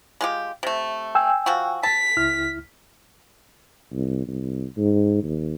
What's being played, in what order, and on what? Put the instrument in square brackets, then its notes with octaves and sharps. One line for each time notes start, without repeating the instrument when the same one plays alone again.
[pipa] G#3 F4 G4
C3 A3
[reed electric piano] G5 G#5 E6
[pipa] F3 F#4
[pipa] A5 [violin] B6
[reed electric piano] C#2 E4 F6
[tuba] C2
C2
G#2
D#2